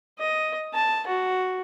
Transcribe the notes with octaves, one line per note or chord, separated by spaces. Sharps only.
D#5
A5
F#4